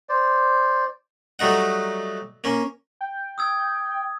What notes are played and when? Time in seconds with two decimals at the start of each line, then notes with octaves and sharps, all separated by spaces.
0.09 C5 D5
1.39 F#3 G3 A3 D#4 F#5
2.44 A#3 C#4
3.01 G5
3.38 D#6 E6 G#6